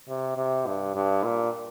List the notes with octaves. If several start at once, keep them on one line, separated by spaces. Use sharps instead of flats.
C3
C3
G2
G2
A#2